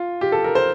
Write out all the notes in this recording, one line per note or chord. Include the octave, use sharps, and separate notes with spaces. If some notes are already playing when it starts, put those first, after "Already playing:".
Already playing: F4
G4
A4
A#4
C5